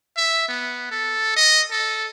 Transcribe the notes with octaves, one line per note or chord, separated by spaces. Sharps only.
E5
B3
A4
D#5
A4